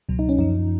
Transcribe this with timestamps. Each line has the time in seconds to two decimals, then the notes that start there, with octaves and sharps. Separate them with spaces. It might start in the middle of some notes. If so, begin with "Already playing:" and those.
0.09 C#2 B2 F#3
0.19 D#4
0.29 C#4
0.38 F#2 F3 D#4